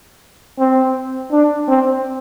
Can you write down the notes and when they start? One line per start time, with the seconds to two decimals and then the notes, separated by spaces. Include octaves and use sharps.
0.59 C4
1.32 D4
1.68 C4